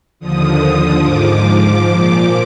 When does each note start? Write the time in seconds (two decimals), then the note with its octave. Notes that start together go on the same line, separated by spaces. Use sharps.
0.19 D#2 D3 F3 D#6
1.00 G#2 F3 D6
1.83 A#2 F3